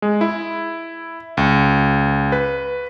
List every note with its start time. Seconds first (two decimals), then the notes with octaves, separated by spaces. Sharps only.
0.02 G#3
0.21 E4
1.37 C#2
2.32 B4